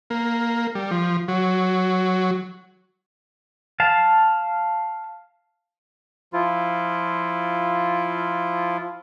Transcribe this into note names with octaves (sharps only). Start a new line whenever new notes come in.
A#3
G3
F3
F#3
F5 A5
F3 E4 F4